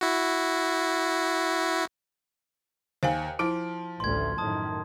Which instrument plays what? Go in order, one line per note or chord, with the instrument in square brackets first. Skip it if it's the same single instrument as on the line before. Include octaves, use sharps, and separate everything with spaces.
[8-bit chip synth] E4 F#4
[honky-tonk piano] D#2 [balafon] C5 F5 G#5
[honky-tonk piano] F3 D7 [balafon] E4
[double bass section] A1 D2 A3 [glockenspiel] C6 G#6
[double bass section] F#2 A2 D#3 [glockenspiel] A5 D#6